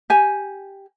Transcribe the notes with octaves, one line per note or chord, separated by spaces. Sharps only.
G4 G#5